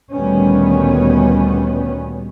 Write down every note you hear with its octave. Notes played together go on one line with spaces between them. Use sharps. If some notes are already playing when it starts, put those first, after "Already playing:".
D2 A#2 D#3 G3 B3 C#4